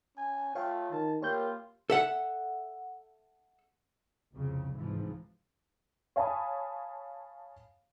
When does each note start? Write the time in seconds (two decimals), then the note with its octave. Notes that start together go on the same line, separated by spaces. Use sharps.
0.17 C#4 G#5
0.55 A3 F4 C#5 F5 G5
0.91 D#3 A5
1.22 A#3 F4 G4 C#5 G6
1.90 A4 E5 F#5
4.33 C2 F2 C#3
4.76 C2 G#2 E3 F3
6.16 C#5 F5 G#5 A5 B5 D#6